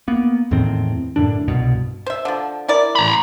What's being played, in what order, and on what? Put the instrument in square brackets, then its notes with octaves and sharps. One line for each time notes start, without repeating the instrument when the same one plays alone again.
[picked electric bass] A#3 B3
E2 A2 D#3 C4
F#2 A2 D3 D4
C2 G2 B2
[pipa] C5 E5
D3 F3
E4 A#4 D5
[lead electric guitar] A#5 B5